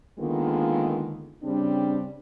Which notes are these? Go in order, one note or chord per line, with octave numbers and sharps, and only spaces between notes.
D3 D#3 G#3 A#3 B3 F4
C#3 G3 C4 D4